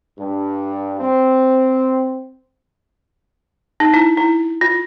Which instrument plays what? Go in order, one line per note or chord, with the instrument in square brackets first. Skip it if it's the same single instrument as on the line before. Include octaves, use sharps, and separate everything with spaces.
[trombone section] G2
C4
[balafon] D#4
E4
E4
F4